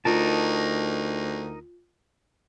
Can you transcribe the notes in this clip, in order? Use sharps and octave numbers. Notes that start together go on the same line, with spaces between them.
D2 D#4 F4 A#4 A5